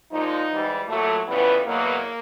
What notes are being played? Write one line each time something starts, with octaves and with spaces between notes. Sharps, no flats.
A#2 F3 G#3 D#4
G#2 E3 G3
A#2 F#3 A3
F2 C#3 E3 G3 B3
E2 B2 F#3 A#3